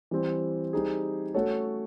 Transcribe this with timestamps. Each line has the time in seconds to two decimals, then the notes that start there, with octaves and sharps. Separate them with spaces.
0.11 E3 G3 C4
0.73 G3 C4 D#4 G#4
1.34 A3 C#4 F#4 A4 C#5